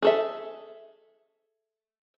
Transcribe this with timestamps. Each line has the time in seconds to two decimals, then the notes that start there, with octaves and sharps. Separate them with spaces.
0.02 G#4 A4 E5